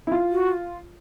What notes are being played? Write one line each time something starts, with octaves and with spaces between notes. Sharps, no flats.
E4
F4
F#4